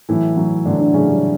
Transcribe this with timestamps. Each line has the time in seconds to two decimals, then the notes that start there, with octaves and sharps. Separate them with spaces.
0.09 A2 E3 F#3 E4
0.37 A2 F#3
0.65 A2 D3 F#3 D4
0.80 D3 D4
0.94 A2 C#3 F#3 C#4
1.08 G3